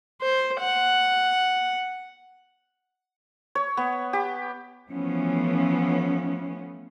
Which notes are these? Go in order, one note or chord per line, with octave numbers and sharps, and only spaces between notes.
C5
F#5
C#5
B3
G4
E3 F3 A3 B3 C#4